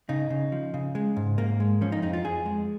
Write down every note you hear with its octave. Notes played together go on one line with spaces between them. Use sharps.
C#3 D#4
C#3
F3
C#3
G#3
G#2
G#2 A#3
G#3
F3 C#4
D#4
F2 D#4
F4
F2 G#4
G#3